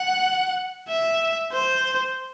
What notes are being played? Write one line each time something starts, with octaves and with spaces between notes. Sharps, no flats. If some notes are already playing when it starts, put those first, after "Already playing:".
Already playing: F#5
E5
C5